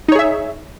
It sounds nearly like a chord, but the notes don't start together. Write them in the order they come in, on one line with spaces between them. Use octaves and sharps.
D#4 C#5 G#4 E5